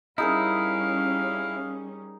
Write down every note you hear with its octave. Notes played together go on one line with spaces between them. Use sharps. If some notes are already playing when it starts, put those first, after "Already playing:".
G3 C#4 D#4 E4 G#4 A#4 F5